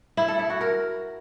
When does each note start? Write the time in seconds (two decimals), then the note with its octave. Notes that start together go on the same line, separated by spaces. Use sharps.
0.17 E4
0.28 A4
0.39 E4
0.50 F#4
0.61 A#4